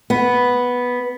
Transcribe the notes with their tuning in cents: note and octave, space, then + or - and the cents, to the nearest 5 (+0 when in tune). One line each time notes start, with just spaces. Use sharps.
B3 -5